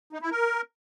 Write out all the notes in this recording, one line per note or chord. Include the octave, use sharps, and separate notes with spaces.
D#4
E4
A#4